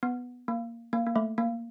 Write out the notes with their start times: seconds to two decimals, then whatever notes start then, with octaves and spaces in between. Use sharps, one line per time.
0.03 B3
0.48 A#3
0.93 A#3
1.06 A#3
1.16 A3
1.38 A#3